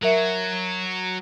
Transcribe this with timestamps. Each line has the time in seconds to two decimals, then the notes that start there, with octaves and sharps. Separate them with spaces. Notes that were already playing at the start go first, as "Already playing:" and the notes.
0.03 F#3 A#4 E5